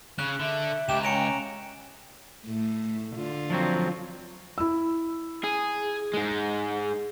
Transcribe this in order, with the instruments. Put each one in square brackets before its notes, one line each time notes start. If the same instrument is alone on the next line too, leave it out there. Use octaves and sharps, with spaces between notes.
[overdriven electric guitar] C#3 [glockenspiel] F#6
[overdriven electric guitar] D3 [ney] E5
[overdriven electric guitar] C#2 [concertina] G4 G5 [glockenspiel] E7
[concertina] C#4 A#5 [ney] G5 [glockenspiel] C#7 D7 F7
[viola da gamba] A2 A3
D3 F4
[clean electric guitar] F3 F#3 C4
[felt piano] E4 E6
[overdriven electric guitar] G#4
G#2 G#3